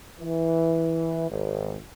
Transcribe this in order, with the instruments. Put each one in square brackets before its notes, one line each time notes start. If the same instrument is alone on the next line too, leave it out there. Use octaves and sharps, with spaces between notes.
[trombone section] E3
G#1